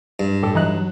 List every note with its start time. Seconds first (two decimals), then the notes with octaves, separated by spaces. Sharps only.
0.20 G2
0.43 A2 G4 A4
0.55 E3 F#3 D#4 F#6